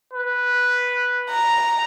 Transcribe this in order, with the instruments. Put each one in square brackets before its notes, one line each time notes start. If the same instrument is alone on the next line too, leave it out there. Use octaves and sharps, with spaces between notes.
[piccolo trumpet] B4
[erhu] A#5